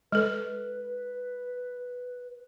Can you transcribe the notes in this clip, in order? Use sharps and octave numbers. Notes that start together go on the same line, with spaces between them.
G#3 A4 B4